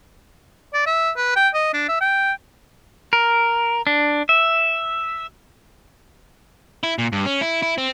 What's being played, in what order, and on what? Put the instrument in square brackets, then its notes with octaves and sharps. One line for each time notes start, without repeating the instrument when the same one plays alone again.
[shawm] D5
E5
B4
G5
D#5
D4
E5
G5
[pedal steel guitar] A#4
D4
E5
[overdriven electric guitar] E4
A#2
G2
C#4
E4
E4
C4